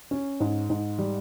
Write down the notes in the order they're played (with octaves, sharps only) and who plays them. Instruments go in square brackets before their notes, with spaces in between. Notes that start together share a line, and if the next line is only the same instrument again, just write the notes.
[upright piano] C#4
G#2
G#2
G3